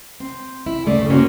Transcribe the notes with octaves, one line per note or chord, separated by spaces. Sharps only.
C4
E4
D2 G2 C#3 A3 D5
G2 C#3 A#3 C4 C#4 F#4